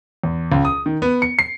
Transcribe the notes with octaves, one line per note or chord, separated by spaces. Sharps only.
E2
C#2
D#6
D#3
B3
C#7
C7